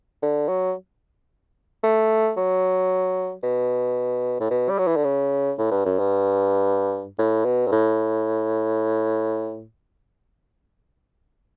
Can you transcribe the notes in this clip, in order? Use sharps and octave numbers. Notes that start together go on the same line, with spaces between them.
D3
F#3
A3
F#3
B2
A2
B2
G3
F#3
E3
D3
C#3
A2
G2
F#2
G2
A2
B2
G2
A2